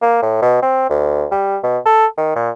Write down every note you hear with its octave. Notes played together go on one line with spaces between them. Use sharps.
A#3
A2
B2
C4
D2
G3
B2
A4
D#3
A#2